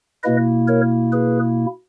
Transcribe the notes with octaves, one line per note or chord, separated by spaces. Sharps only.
B2 A#3 E4 B4 D#5
A#4 C#5
G#4 B4